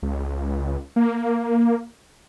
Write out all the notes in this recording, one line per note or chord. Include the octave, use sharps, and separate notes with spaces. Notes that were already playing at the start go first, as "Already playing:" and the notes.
C#2
A#3